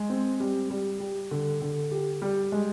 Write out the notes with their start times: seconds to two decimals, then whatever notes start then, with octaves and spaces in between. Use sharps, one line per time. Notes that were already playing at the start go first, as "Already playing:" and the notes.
Already playing: G#3
0.10 C4
0.40 G3
0.70 G3
1.00 G3
1.31 D3
1.62 D3
1.91 G4
2.22 G3
2.52 G#3